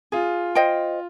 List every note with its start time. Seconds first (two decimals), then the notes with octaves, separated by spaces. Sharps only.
0.12 F4 G#4
0.55 C5 D#5 G5